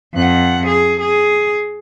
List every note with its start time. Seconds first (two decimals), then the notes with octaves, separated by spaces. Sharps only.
0.15 F2 F#5
0.67 G#4
1.00 G#4